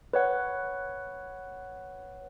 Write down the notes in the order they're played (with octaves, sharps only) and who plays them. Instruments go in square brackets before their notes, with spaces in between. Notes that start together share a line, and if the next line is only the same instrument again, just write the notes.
[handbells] B4 C#5 F#5